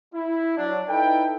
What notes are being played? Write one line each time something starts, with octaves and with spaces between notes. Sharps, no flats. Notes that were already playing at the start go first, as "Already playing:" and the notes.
E4
F#3 D4
D#4 E4 A4 B4 G5